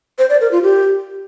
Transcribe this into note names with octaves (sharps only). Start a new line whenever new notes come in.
C5
D5
A#4
F4
G4